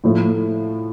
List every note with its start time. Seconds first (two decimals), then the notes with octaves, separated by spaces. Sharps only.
0.04 A2 F3 A3 E4